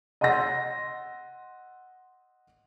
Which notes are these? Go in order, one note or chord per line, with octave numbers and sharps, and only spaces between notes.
D#5 F#5 C6 E6 A#6